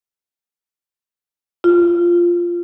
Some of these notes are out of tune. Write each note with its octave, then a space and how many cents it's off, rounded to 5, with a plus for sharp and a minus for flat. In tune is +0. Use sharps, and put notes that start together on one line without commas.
F4 -5